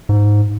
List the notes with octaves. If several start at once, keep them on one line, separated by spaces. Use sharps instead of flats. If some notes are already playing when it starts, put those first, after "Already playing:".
G#2